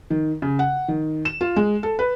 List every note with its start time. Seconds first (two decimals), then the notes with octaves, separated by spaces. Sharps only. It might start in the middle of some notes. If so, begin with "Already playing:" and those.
0.10 D#3
0.42 C#3
0.59 F#5
0.88 D#3
1.25 E7
1.41 F4
1.56 G#3
1.83 A4
1.99 B4